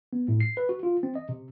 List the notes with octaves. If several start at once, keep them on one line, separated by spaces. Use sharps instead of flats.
B3
A2
C7
B4
F#4
F4
C4
D#5
C3